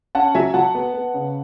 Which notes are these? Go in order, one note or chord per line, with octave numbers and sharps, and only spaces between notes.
C#4 F#5 A5
F#3 E5 G#5
F#3 F#5 A5
B3
B3
C#3